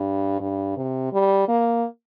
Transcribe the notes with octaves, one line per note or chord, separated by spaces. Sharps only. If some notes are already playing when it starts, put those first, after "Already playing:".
Already playing: G2
G2
C3
G3
A#3